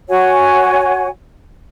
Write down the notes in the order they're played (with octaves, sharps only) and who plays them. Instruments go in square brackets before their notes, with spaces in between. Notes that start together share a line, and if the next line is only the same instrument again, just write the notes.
[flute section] F#4 C#5 F#5 G#5